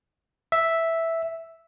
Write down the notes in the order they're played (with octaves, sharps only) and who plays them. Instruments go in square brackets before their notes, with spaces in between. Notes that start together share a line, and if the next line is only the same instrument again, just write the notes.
[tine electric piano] E5